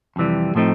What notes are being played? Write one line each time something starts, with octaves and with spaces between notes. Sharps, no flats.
F2 C3 E3 G3
A2 F3 A3 C4 D#4